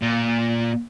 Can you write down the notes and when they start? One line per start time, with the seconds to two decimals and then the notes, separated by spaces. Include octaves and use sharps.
0.02 A#2